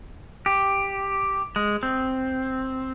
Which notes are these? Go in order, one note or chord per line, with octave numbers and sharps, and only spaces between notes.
G4
G#3
C4